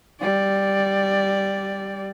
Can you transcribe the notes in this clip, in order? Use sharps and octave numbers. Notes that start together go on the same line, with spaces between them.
G3 D5